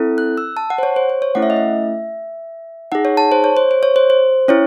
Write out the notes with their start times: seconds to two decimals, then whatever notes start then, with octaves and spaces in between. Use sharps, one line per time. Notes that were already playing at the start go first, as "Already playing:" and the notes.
Already playing: C4 E4 A4
0.18 F#6
0.38 E6
0.57 A5
0.70 F#5
0.78 C5
0.83 C#5
0.96 C5
1.10 C5
1.22 C#5
1.35 A3 C#4 E4 F#5
1.42 E5
1.50 D#5
1.56 E5
2.92 D#4 G#4 F#5
3.05 C#5
3.17 A5
3.32 C5
3.44 C#5
3.57 C5
3.71 C5
3.83 C#5
3.96 C5
4.10 C5
4.48 C#4 E4 C#5